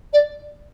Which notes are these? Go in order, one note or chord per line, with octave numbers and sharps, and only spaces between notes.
D5